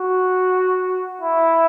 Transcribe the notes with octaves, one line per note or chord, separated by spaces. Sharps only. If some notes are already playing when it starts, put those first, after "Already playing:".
Already playing: F#4
E4